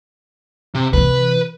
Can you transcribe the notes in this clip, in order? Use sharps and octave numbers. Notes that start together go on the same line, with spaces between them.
C3
C3 E3 B4